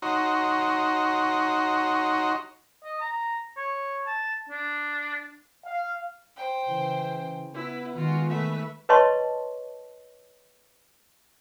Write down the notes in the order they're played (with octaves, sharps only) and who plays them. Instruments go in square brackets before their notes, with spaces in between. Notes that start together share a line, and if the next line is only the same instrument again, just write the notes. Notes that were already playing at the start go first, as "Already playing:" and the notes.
[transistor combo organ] D#4 F#4 C#5 A#5 C6
[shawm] D#5
A#5
C#5
A5
D4
[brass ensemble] F5
[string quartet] C5 G5
[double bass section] C#3 [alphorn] E3
[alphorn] B3 [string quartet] E4 B4
[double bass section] D#3 G#3 [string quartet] F4 F#4
[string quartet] A3 B4 E5
[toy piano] B4 C#5 D#5 A5 C6 C#6